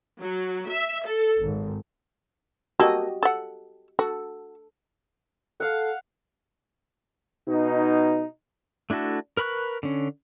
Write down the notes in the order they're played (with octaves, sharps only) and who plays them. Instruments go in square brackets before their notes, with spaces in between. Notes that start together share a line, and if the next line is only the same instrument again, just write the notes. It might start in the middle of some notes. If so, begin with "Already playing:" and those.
[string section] F#3
E5
A4
G#1
[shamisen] A#3 A4 [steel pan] F#4 G4 D#5
[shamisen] A4 F#5
[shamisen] F#4 [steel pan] A4
[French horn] A4 [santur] F5 F#5
[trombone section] B2 D#4
[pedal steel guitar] A3 D4 E4 F#4 A4
A#4 B4 B5 C#6 F#6
D3 C#4